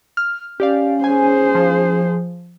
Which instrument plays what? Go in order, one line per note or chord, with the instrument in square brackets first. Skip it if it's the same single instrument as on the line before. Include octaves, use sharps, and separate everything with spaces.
[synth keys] F6
[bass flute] C#4 [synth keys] G4 D5 F5
[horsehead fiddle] G#4 C5 [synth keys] G#5
[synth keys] F3